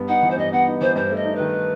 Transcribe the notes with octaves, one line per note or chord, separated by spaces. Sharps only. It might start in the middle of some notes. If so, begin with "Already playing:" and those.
Already playing: G2 B3
D#4 F#5
E3
C5
G2 D#5
B3 F#5
D#4
E3 C5
G2 C5
A3 D#5
D#4
D#3 B4